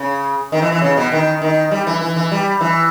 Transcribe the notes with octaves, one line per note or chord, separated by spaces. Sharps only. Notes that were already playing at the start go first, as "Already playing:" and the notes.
Already playing: C#3
D#3
E3
E3
C#3
B2
D#3
D#3
G3
E3
E3
E3
G3
E3